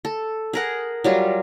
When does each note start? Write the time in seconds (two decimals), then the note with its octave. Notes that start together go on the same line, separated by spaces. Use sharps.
0.05 A4
0.53 G#4 A#4 F#5
1.04 F#3 G3 F4